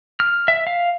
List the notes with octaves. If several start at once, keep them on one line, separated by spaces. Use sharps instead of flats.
F6
E5
F5